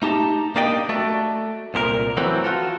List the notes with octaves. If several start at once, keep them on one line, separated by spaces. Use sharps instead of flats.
A3 D#4 G4 A5 A#5
A#3 D4 G4 D5 D#5 G5
A3 F#4 A4 D5
C2 A#2 G4 A#4
E3 F#3 A3 C4
F4 F#4 A4